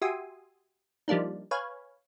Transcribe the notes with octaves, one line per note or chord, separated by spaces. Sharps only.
F#4 G4 E5 G#5 C6 D#6
F3 G3 A#3 D4 D#4
B4 C#5 F5 G#5